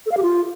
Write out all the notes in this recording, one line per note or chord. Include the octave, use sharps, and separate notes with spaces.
A4
F5
G4
F4